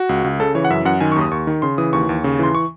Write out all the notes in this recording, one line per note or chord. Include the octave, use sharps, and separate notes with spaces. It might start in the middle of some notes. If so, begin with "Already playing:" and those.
Already playing: F#4
C#2
C#2
C#3 A4
E3 C#5
F#5
F#2 E5
F#2 F#5
D#3 G#5
C#6
D#2
D#6
D#2 C#6
D#3
C#3 C6
E3 D#6
D#2 C#6
D#2
C#3
E3 C6
C#6